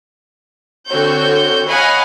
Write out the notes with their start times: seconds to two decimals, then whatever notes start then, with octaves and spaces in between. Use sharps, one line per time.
0.88 D3 C4 F#4 C#5 G6
1.67 C#5 D#5 F5 F#5 G#5 B5